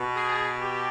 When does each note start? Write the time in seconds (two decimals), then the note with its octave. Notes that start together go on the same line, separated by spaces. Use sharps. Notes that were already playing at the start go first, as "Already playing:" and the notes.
Already playing: B2
0.14 G#4
0.61 G4